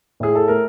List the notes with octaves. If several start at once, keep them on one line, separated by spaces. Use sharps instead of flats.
A2 G#4
A4
A3 A#4